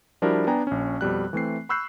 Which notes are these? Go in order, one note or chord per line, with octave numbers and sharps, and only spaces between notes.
F3 G3 D4 E4 F#4 A#4
B3 D4 G5 G#5 A#5
A#1 C#4
F2 B2 G3 F#6
E3 A3 C4 C7
B5 C#6 E6 F#6 G6 C7